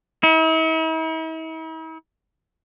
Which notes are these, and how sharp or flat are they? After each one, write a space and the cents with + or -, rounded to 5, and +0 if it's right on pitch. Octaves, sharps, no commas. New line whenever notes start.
E4 -45